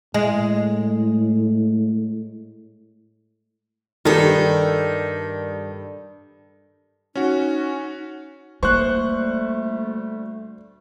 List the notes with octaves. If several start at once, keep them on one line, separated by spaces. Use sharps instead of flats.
A2 G#3
G2 D#3 G3 G4 A4
C#4 D#4 F#4
D2 G3 A3 A#3 C5 C#6 F#6